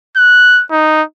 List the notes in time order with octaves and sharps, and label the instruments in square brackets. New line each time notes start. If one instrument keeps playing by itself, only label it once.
[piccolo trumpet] F#6
D#4